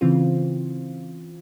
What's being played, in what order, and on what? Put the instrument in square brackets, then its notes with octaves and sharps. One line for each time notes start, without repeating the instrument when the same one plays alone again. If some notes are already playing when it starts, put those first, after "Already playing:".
[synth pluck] C#3 E3 C4 F4